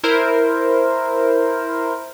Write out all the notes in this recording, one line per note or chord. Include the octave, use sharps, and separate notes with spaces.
E4 A#4 C5